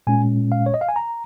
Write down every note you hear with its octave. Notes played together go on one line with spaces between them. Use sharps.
A#2 G#3 C#4 G#5
F5
C#5
D#5
F5
G#5
A#5